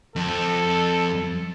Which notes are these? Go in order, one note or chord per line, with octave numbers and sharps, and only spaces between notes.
F2 C4 A4